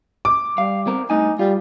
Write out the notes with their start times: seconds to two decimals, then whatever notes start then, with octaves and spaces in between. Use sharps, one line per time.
0.25 D6
0.58 G3 F5
0.87 C4 A#4
1.10 G2 A3 D#4 G#5
1.39 G3 F4